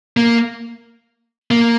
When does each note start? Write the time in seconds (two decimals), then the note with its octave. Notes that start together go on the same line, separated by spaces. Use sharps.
0.17 A#3
1.51 A#3